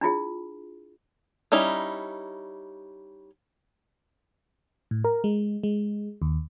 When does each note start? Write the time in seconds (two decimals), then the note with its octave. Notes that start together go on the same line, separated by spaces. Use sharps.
0.01 D4 E4 F4 G#4
1.52 G3 C#4 D#4 E4
4.91 A2
5.04 A#4
5.24 G#3
5.63 G#3
6.22 D#2